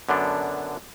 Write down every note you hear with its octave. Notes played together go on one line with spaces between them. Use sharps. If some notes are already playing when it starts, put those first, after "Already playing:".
F#2 D3 B3 D4